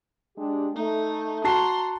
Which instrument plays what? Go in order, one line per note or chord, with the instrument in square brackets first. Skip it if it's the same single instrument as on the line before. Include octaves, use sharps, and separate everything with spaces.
[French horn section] G#3 D4 G4
[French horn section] A3 [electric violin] D#4
[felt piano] F#4 A5 C7 [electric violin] A#5 C6